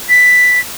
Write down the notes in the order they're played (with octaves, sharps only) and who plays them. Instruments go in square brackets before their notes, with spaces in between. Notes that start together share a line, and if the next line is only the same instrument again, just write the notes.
[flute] B6